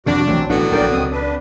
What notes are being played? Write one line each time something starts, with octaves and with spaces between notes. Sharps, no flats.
F2 C3 D#3 G3 D4 F#4 D6
B1 E3 F#3 A3 C4
A1 D3 F#3 B3 D4 F#4 F#5
A#1 D#3 D4 A#4 D5 G5
C#2 D#3 C4 D#6
D4 B4